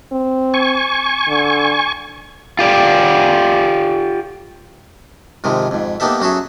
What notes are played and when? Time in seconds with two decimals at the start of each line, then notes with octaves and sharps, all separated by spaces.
0.12 C4
0.54 G#5 C#6
1.28 D3
2.59 F4 G4 D5
5.44 G#2 C3 D#3 F3 G#3
5.71 F2 G#2
6.00 A#3 B3 D#4 G4 A4 E5
6.20 F#2 F#4 G#4 A4 E5